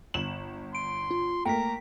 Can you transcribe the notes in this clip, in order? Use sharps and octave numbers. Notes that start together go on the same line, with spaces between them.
G1 E7 F#7
C6 D7
F4
A3 A#3 A#4 G5 A#5 B6